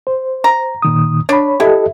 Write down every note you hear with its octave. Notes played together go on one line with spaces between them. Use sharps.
C5
A#5
A#2 D#3 D#6
D4 C#5 B5
E4 G4 A4 D#5